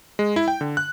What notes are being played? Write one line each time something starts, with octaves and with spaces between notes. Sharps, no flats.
G#3
E4
G5
D3
F#6